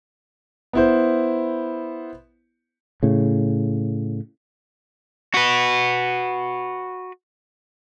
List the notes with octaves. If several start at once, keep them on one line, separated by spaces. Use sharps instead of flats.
B3 E4 C5
A2 C#3
F#4 B4